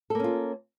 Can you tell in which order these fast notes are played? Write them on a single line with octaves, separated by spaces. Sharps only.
A4 A#3 C#4 F4